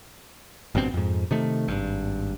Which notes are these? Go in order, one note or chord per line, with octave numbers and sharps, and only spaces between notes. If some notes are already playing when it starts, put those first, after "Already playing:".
G#1 G2 B2 C4
F2 G#2
C3 D#3 A3
G#1 G2